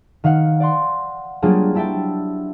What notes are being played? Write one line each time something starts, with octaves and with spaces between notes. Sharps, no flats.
D#3 F5 F#5
D5 F#5 C6
F#3 G3 A#3 D4 F4 G#4
D4 E4 E5 G5 A5